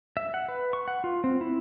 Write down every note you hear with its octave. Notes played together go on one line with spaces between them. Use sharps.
E5
F#5
B4
C#6
F#5
F4
C4
E4